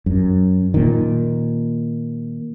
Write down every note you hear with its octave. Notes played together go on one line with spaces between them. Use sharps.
F#2
A#2 D#3